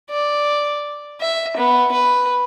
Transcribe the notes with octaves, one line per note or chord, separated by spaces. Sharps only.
D5
E5
B3
B4